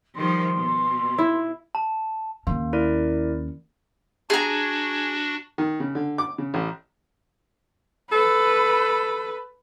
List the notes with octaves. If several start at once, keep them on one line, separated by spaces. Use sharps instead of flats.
D#3 F3 G3 C6
B2
E4
A5
D#2 A#3 C#4
E4 A#4 D5
D4 F#4 G#4 A#5
D#3
C#3
D3
D6
C#3
A1
A4 B4